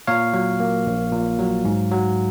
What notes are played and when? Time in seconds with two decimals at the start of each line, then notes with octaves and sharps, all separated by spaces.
0.07 A#2 C#5 F5
0.34 F#3
0.60 A#3
0.87 A#1
1.12 A#2
1.39 F#3
1.65 G#2
1.91 F#3